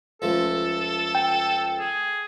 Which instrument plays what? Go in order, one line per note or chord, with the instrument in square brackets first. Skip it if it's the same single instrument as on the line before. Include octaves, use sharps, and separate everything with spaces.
[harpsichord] C#2 F3 A3 [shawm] A4
[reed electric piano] G5
[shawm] G#4